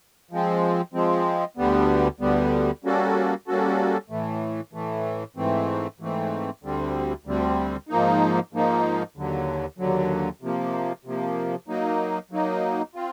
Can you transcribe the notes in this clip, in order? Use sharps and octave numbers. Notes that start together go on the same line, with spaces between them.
F3 G#3 C4
F3 G#3 C4
D2 D3 G3 B3
D2 D3 G3 B3
G3 A#3 C#4 F#4 A4
G3 A#3 C#4 F#4 A4
A2 E3 A3
A2 E3 A3
G#2 E3 A3 C4
G#2 E3 A3 C4
D2 D3 G3 C4
D2 D3 G3 C4
G#2 F3 A#3 D#4
G#2 F3 A#3 D#4
D#2 D3 F#3
D#2 D3 F#3
C3 F3 A#3
C3 F3 A#3
F#3 A#3 D#4
F#3 A#3 D#4
C4 F4